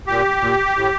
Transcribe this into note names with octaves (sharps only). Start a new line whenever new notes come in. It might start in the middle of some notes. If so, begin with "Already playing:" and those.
A#2 G4
A#2
A2